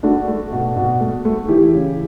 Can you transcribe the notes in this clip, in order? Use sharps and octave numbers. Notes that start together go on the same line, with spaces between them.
A3 D4 F#4
A3
B2
B2
A3
A3
E3 E4 G4
C#3